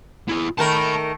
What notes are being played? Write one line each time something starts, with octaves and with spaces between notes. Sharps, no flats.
E4 G#4
D#3 A3 A#4 A5 B5